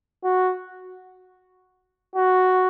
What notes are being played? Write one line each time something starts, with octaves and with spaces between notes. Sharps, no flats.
F#4
F#4